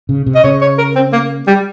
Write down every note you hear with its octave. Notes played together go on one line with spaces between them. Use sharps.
C#3
C3
D#5
C#3 C#5
C#5
A#4
C4
A#3
G3